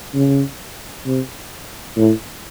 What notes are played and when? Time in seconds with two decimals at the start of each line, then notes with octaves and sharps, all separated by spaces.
0.14 C#3
1.05 C3
1.97 A2